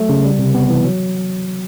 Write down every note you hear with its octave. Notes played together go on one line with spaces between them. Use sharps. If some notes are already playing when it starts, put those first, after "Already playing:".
Already playing: F#3 A3
C#3
G3
C3
B3
E3
F#3